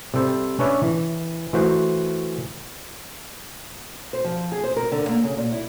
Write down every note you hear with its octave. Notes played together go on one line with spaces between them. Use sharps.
C3 G3 A4 C5
C#4 D4 B4 C#5 E5 A5
E3
E3 A3 F#4 C5
C5
F3
G#4
C5
A#4
D3
A#3
C#3
A#2
E4